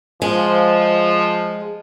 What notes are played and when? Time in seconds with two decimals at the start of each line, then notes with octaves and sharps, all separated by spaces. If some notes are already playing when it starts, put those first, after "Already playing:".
0.22 F3 G#3